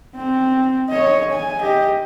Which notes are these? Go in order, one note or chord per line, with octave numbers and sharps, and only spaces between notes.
C4
C#5 D#5
G#5
G4 D#5